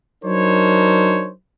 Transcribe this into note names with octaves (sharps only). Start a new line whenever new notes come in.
F#3 D4 D#4 A#4 C5 C#5